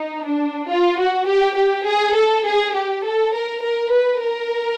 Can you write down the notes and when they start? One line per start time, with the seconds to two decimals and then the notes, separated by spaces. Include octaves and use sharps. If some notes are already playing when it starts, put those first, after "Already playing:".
Already playing: D#4
0.26 D4
0.69 F4
0.99 F#4
1.27 G4
1.56 G4
1.87 G#4
2.15 A4
2.45 G#4
2.74 G4
3.04 A4
3.33 A#4
3.63 A#4
3.92 B4
4.21 A#4